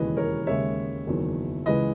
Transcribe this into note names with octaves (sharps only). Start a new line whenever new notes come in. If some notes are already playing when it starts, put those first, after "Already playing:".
Already playing: E1 D#2 C#3 E3 B4 D#5
A#4 C#5
D#2 C#3 G#3 C#5 E5
F#1 E2 D#3 F#3
C#2 C#3 E3 G#3 B4 D#5